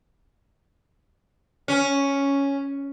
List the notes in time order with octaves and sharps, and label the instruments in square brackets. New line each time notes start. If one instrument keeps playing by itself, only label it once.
[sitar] C#4